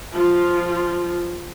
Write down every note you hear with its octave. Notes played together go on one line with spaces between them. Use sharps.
F3 F4